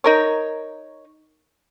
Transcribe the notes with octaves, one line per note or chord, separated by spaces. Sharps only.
D#4 A#4 C#5